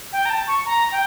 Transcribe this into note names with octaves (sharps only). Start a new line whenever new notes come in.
G5
A#5
A5
C#6
A#5
G5